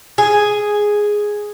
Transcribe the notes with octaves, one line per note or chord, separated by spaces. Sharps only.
G#4